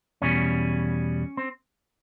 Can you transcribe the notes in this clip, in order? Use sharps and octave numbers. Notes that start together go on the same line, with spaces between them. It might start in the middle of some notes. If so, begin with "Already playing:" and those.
E2 B2 G3 C#4
C4